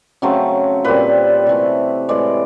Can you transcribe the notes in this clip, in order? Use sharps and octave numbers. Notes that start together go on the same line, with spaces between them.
C#3 F#3 A3 C4
A#2 G3 C4 B4
C3 E3 A3
A2 E3 G#3 D5